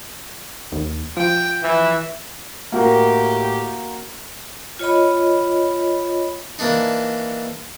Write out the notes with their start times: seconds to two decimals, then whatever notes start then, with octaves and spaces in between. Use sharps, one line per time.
0.72 D#2
1.17 F3 G5
1.63 E3 E5
2.72 A2 A#3 F#4 G4 A#4
4.79 F4 C#5 D#5 B5
6.59 E3 A#3 D4 D#4